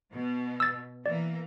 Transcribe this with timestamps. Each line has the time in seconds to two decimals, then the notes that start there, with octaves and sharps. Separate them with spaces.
0.12 B2
0.60 E6 A6
1.06 E3 A#3 D5